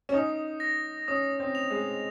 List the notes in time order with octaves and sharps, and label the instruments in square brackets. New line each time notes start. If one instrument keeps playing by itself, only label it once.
[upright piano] C#4
[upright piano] D#4 [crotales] D#6
[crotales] A#6
[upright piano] C#4 [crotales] D#6
[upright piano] C4
[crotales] F7
[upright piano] G#3